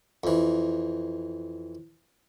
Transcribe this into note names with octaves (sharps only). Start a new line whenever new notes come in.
F2 E3